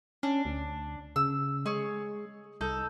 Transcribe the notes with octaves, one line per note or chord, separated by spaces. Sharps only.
C#4 D4
D2
C#3 E6
G#3 G#4 C#5
C2 D#4 A4 G6